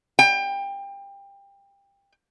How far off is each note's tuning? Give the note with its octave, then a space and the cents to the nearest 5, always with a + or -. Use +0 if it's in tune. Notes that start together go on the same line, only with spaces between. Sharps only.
G5 +25